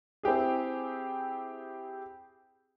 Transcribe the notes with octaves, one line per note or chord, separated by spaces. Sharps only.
C4 E4 G4 G#4